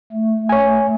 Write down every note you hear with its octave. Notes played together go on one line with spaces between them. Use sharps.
A3
C#5 G#5